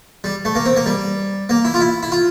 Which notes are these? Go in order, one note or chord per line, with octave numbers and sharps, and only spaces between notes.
G3
A3
A#3
C4
A#3
G3
A#3
E4
F4
E4
E4
F4